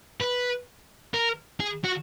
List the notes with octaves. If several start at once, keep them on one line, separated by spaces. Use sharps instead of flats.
B4
A#4
G#4
F#4